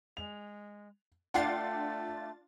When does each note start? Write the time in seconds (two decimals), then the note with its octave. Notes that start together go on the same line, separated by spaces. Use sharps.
0.17 G#3 F7
1.34 A3 D4 F4 F#5 G5 A6 C7